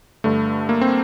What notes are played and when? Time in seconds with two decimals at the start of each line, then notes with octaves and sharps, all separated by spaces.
0.24 G2 D3 A3
0.69 A#3
0.81 C4